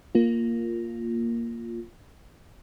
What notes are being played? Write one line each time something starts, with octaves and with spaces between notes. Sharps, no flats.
A#3 F4